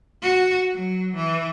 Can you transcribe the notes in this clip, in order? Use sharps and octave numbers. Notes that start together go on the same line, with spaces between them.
F#4
F#3
E3